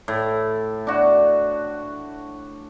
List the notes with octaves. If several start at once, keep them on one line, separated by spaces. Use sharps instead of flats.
A2
D4 F#4